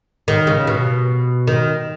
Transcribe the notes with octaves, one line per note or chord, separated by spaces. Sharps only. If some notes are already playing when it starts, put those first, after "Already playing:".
D#3
C#3
B2
D#3